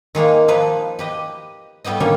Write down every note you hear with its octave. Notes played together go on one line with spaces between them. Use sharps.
D#3 G#3 A#3 D#4
F3 D#4 B4
G4 B4 D#5
A2 G3 B3 G4 D#5
D3 D#3 G3 A#3 C#4